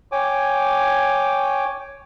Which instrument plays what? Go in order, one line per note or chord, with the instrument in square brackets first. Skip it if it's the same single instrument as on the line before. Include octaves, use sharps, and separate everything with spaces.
[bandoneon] C#5 G5 G#5 D6